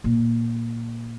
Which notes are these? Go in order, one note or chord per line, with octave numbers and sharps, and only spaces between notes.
A#2